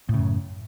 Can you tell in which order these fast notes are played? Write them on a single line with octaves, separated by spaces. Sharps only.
A2 C#3 F#2